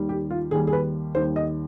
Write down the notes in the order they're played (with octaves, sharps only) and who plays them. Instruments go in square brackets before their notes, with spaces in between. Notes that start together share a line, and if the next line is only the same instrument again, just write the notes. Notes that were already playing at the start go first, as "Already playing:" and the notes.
Already playing: [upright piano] D#2 D#3 G3
G4
F4
D#2 D#3 G3 G#4
G#4
B4
D#2 D#3 G3 C5
D#5